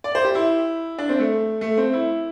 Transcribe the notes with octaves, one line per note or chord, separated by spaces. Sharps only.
D5
C5
G4
E4
D4
C4
A3
A3
C4
E4